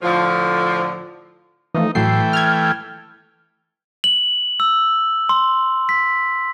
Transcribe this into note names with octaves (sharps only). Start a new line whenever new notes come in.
A2 D3 F3
E3 F3 A3 D#4
A2 E3 F#3 A3 G5 C7
F6 G#6
F#7
E6
C6
B6